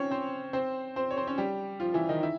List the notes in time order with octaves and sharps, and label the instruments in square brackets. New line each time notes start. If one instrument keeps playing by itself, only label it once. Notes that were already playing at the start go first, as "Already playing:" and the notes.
Already playing: [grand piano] C4 C#4 C#5
C4 C5
C4 C5
C4 C5
C#5
C4 C5
C#4 C#5
G3 G4
F3 F4
E3 E4
D#3 D#4
E4